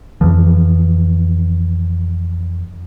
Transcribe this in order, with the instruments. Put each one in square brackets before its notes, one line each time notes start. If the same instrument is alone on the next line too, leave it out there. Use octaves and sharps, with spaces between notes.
[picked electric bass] F2 E3 F3